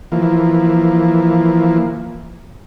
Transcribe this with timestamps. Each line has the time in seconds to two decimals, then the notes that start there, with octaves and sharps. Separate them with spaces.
0.12 E3 F3 A#3